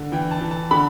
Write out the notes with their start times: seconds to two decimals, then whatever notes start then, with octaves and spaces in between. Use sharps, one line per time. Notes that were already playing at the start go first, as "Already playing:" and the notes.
Already playing: D3
0.12 E3 G5
0.31 A5
0.41 E3
0.51 A5
0.71 D3 B5